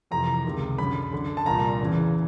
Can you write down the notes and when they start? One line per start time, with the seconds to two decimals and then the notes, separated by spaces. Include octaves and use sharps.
0.11 F2 C3 E3 A#5
0.45 C#2 C3 D#3
0.78 F#2 D3 B5
1.12 F#2 D3
1.37 A5
1.46 C2 A#2 A#5
1.80 E2 C#3 E3